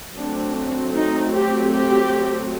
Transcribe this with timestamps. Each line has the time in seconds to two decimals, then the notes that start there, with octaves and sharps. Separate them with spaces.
0.17 F#3 A3 C4 D4
0.95 D#4
1.34 G4
1.73 G4